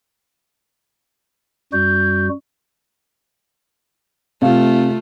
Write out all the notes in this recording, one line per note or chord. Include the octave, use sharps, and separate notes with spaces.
F#2 G3 F#4 G6
C3 A3 F4 F5